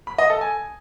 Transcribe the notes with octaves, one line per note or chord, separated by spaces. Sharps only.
B5
D#5
A4
G#5